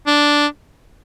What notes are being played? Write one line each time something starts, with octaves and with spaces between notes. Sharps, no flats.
D4